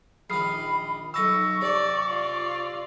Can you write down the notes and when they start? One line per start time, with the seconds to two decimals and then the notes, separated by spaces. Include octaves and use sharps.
0.30 A#1 D#3 B5 D#6 F6 C7
1.14 B1 D#4 A5 C#6 E6 A#6
1.61 C3 D5 A5
2.09 F4 D5